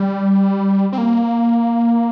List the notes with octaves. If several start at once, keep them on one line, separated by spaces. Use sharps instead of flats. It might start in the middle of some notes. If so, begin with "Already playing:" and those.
Already playing: G3
C4
A#3